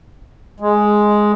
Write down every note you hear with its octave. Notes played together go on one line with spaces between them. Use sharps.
G#3